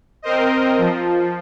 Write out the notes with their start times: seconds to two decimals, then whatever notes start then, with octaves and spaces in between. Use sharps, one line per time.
0.22 C4 A#4 C5 D#5
0.78 F3